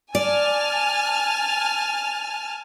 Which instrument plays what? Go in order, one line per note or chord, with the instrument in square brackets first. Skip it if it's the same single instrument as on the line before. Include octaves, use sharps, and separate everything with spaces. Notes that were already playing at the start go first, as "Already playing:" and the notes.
[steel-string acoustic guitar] D5 [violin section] G#5 A5 F6